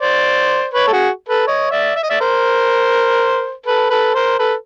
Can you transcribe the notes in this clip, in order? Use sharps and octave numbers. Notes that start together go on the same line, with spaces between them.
C5 D5
B4 C#5
A4
F#4 G#4
A4 B4
C#5 D#5
D5 E5
E5
D#5
D5 E5
A#4 C5
A4 B4
A4 B4
A#4 C5
A4 B4